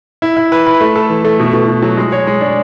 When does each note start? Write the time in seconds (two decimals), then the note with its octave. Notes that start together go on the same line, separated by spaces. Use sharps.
0.22 E4
0.37 E4
0.52 B4
0.67 B4
0.81 A3
0.95 A4
1.10 E3
1.25 A3
1.40 B2
1.53 B2
1.68 B2
1.82 F#3
1.97 G#3
2.12 C#5
2.27 G#3
2.41 D4